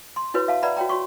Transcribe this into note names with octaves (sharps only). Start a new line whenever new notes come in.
C6
E4 F#4 B4 C#5
E5 F5 A5
B4 D5 E5 F#5 A#5 B5
F#4 C#5 G5 A#5
F#4 C#5 C6 C#6